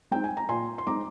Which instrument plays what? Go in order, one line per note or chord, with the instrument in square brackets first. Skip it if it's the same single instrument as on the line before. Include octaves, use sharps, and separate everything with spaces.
[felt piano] G#3 C4 D#4 G5
G#5
A#5
A#2 G#5 C6
C6
G#3 C4 D#4 A#5 D6